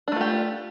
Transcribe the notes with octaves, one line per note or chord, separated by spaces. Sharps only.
A3 D4 F4 G4